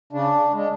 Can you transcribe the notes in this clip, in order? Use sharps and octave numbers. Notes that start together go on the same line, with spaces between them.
C#3 D4
G#3 D4